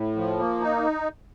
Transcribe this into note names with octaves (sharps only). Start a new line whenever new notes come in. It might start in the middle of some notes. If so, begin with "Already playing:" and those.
Already playing: A2
F3
A#3
D#4